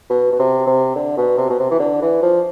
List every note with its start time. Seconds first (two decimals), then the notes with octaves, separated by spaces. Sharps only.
0.10 B2
0.32 B2
0.39 C3
0.67 C3
0.96 D3
1.17 B2
1.38 C3
1.50 B2
1.59 C3
1.71 E3
1.79 D3
2.02 E3
2.22 F3